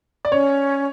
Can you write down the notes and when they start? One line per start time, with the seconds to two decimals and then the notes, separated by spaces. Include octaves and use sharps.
0.25 D5
0.32 C#4 C#5